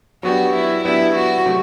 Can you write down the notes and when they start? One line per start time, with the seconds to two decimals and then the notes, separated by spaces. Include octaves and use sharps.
0.23 F#3 B3 D4 F#4 G4
0.54 E4
0.85 F#3 B3 D4 E4 G4
1.15 F#4
1.46 C3 F#3 A3